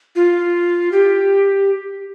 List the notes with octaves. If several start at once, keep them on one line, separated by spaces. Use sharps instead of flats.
F4
G4